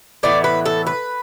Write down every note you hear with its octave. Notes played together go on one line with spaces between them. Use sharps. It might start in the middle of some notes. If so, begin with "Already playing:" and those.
A2 E3 B3 D5
B4
A4
B4